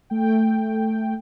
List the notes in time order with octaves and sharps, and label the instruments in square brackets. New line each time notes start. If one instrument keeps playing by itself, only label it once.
[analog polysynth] A3 G5